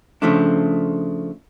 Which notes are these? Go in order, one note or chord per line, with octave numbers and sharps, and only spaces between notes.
C#3 F3 A3 D4